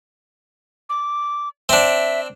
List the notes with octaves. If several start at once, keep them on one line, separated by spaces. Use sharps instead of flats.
D6
C4 D4 E5